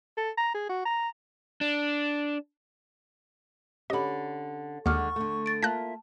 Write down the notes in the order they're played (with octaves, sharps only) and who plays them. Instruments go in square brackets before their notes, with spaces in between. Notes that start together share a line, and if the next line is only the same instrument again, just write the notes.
[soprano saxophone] A4
A#5
G#4
F#4
A#5
[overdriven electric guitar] D4
[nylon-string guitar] D3 C#4 [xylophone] G4 B5 [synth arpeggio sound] D#5
[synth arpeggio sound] D#2 [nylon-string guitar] D3 G#3 [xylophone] F#5 D6 F6 [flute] C#6
[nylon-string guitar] D3 A3
[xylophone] A6 D7
[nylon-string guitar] A#3 F4 [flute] E5 [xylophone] A5 [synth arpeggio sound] F#6 G6 A#6